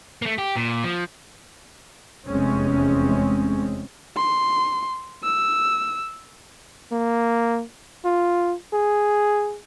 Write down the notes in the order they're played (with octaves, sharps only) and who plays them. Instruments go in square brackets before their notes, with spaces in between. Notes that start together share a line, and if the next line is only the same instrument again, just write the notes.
[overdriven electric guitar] A3 A#3
G4
A#2
F3
[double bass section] F1 E2 G#3 C4 C#4
[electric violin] C6
E6
[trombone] A#3
F4
G#4